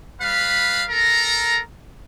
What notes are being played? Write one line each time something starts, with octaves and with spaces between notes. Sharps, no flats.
G3 B4 F5 B5
A4 A#4 A#5